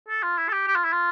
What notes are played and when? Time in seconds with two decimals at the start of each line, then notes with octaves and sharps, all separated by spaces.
0.08 A4
0.23 F4
0.38 E4
0.48 A4
0.52 G4
0.67 G4
0.76 F4
0.84 E4
0.93 F4